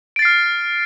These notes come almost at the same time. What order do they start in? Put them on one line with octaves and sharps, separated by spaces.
D7 A6 C7 F6